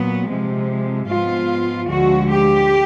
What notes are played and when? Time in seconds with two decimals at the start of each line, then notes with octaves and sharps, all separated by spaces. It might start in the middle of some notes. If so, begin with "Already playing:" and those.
Already playing: A#2 F#3 B3
0.29 C3 F3 G#3
1.09 G#2 F3 G#3 B3 F4
1.89 D2 D3 F3 G#3 F#4
2.30 G4